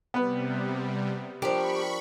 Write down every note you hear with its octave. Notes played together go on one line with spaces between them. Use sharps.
C3 G3 B3 B4
F3 D4 G4 A#4 B5 C#6